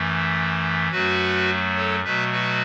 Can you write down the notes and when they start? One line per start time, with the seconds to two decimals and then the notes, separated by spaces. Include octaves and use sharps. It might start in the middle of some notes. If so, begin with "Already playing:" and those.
Already playing: F#2 E3 A3
0.91 F#2 F#3 A3 F#4 B4
1.76 A4 C#5
2.04 B2 F#3 A3 B4 E5
2.32 F#4 B4